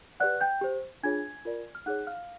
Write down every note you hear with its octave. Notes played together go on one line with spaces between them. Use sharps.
G4 B4 D5 F#5 F#6
G5 G6
G4 C5
D4 F4 G#4 C#5 G#5 G#6
F4 A#4 D5
F6
D#4 G#4 C#5 F#5 F#6
F5 F6